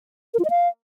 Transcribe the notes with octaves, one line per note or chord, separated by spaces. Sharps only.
A#4
F4
D#5
F5